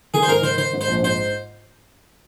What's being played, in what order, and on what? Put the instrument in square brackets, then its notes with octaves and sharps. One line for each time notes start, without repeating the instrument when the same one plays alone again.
[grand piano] D#3 [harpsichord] G#4
[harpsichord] C5
[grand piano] G#2 [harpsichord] A#4
[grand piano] D#3 [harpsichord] C5
[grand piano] D#3 [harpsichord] C5
[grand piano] G#2
[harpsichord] C5
[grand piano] A#1
[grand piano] G#2 [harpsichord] C5